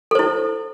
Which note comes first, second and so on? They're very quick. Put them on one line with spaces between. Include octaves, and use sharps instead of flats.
A4 C5 E4